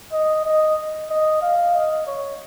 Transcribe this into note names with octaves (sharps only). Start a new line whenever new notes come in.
D#5
D#5
D#5
F5
D#5
C#5